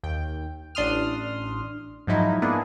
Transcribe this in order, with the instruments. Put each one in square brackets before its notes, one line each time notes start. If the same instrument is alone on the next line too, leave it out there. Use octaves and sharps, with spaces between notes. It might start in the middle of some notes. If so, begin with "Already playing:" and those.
[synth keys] D#2 G5
A1 D4 C6 D#6 F6
G#2 F3 F#3 D#4 E4
A#3 B3 D4 E4 G#4